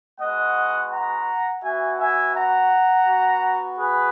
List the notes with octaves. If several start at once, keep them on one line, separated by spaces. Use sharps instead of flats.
G#3 B3 F#4 D#5 F#5
F#5 A#5
B3 F#4 E5 G#5
E5 G#5
F#5 A#5
B3 F#4
G#4 B4